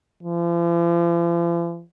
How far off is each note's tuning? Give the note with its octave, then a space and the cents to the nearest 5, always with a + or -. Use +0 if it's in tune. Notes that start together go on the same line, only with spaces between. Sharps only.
F3 -45